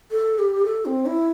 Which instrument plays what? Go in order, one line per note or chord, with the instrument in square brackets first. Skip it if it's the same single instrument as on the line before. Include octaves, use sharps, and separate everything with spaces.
[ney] A4
G4
A4
C4
E4